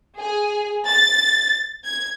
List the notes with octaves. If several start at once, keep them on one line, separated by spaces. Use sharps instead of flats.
G#4
A6
G#6